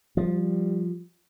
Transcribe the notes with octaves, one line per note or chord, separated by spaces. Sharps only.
F3 G3